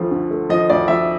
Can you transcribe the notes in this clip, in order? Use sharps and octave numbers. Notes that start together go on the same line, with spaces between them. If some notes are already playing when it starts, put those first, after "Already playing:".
Already playing: D2 F3 A3
D3
A3
F3 D#5
D2 D5
F3 E5